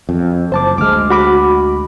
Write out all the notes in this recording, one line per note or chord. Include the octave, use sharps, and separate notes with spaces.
F2
F#1 C5 A5 D6
D2 G#3 D6 F6
F#4 B5 D6